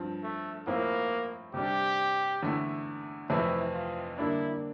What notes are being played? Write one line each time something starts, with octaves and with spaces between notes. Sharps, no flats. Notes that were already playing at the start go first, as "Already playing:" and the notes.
Already playing: G2 F3 C4
A3
A2 F3 A#3 C4 E4
C3 G3 D4 G4
E2 D3 A3 E4
F2 C3 E3 A3 C4 E4
F4
D3 G3 A#3 D4 E4